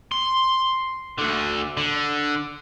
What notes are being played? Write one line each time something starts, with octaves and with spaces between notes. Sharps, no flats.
C6
D2 D3
D3